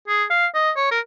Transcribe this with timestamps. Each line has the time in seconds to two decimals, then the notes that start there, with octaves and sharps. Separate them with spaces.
0.08 G#4
0.30 F5
0.55 D#5
0.76 C#5
0.91 A#4